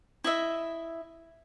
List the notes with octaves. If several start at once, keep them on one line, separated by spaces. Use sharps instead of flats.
E4 D#5 E5